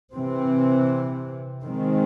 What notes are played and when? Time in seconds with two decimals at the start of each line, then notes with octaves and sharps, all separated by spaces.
0.14 C3 E3 C4
1.62 D#3 G#3 C4